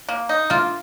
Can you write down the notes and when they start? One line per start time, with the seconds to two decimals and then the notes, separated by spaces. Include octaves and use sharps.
0.09 A#3
0.29 D#4
0.50 A#3 F4